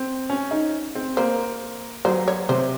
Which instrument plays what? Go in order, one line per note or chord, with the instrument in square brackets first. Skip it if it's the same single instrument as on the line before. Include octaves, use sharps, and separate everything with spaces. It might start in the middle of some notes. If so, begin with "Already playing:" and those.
Already playing: [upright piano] C4
C#4
D#4
C4
[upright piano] A#3 [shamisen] C5
[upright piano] F#3 [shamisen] C5
[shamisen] C#5
[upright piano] C3 [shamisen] C5